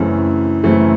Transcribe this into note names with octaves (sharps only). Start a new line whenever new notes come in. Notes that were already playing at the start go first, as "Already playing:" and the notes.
Already playing: F#2 C#3 E3 A3 C4
F#2 C#3 E3 A3 C4